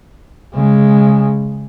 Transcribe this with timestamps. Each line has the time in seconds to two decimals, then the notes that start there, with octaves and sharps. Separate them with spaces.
0.55 C#3 G#3